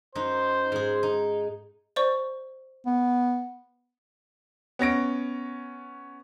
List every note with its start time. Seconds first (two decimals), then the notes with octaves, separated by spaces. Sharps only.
0.15 F#2 D#4 C5
0.72 G#2 G#4
1.03 D#4
1.96 C5 D5 C#6
2.86 B3
4.79 B3 C#4 A#6 D7